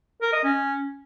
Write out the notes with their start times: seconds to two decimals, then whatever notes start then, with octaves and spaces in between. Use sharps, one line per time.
0.22 A#4
0.33 D#5
0.44 C#4